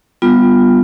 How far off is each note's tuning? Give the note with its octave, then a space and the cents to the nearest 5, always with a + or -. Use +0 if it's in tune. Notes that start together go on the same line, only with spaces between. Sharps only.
G3 +0 B3 +0 F4 +0